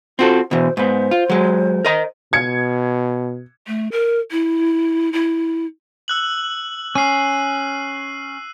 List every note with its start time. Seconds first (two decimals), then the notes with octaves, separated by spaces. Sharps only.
0.19 C4 F4 F#4 A4
0.51 B2 E3 C5
0.77 G#2 B3 C5
1.11 F4
1.30 F#3 G#3
1.85 A#4 D#5 A#5
2.33 B2 G#6 C#7
3.67 A3
3.92 A#4
4.31 E4
5.13 E4
6.08 E6 F#6 F#7
6.95 C#4 C7 D#7